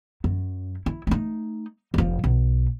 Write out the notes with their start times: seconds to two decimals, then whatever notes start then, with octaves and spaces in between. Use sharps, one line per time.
0.24 F#2
0.86 E4
1.07 A3 D#4
1.94 F1 F3
2.24 B1